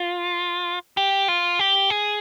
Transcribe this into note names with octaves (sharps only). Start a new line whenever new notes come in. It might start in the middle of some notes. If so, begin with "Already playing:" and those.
Already playing: F4
G4
F4
G4
G#4